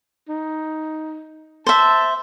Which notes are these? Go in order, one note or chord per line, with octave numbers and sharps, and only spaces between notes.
D#4
C5 E5 A5